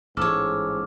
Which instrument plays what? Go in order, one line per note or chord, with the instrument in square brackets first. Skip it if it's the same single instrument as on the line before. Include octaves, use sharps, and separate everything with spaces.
[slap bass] A1 [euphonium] G#2 [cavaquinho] A4 C#5 [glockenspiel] D6 F6